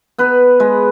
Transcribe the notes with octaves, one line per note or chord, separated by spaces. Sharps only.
B3 B4
G#3